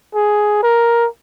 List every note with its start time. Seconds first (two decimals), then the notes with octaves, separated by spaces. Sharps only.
0.15 G#4
0.63 A#4